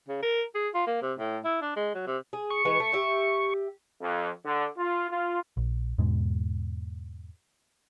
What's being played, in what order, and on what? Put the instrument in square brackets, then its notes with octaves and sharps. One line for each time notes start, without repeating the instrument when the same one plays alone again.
[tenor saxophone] C#3
A#4
G#4
F4
A#3
C3
A2
E4
D4
G#3
F#3
C3
[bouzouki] G#4
[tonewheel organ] C#6
[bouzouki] E3 G#3 B4
A3
G4 E5
[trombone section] F2
D3
F4
F4
[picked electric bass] A#1
E2 G#2 B2 G#3